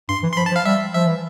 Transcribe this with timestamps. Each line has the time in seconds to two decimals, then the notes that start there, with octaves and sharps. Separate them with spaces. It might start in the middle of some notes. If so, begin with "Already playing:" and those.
0.09 G2 C6
0.23 E3
0.32 C6
0.37 F3 B5
0.46 A5
0.51 F3
0.56 F5
0.66 G3 E5
0.94 F3 E5
1.06 E3